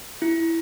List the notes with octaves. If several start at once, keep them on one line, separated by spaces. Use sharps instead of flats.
E4